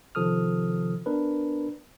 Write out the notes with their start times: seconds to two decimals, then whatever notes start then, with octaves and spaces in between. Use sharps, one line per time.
0.15 C3 D#3 F3 A4 D#6 F6
1.06 B3 D4 A#4 B4